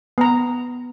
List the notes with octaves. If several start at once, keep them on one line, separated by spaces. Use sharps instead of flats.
B3 A#5